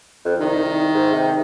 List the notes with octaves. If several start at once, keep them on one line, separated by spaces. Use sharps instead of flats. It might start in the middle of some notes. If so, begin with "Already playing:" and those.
F2
C2 D#3
G#2
C3